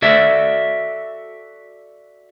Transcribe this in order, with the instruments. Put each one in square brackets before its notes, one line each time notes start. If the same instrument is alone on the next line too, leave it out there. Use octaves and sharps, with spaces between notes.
[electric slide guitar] F#4 A4 D5 E5